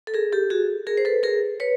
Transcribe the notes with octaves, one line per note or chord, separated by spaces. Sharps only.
A4
G#4 A#4
G4 A4
F#4 G#4
G#4 A#4
C5
A4 B4
G#4 A#4
B4 C#5